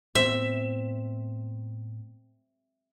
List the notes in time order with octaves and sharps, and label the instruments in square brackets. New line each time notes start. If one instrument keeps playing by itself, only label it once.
[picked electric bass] A2 A3 B3 [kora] C4 [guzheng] E5